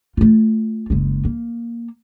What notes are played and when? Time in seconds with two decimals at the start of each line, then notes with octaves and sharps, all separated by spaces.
0.17 A3 F4
0.90 F#1 G#3
1.25 A#3